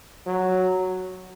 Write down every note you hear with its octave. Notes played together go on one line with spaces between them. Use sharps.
F#3